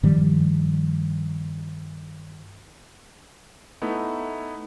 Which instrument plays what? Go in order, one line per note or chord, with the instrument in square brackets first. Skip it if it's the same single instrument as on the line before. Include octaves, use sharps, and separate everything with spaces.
[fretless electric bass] G2 D#3 F3 G3
[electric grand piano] A3 B3 D#4 E4